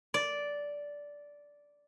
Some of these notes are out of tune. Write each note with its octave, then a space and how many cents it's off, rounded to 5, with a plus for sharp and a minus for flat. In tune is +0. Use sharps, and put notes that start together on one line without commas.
D5 -10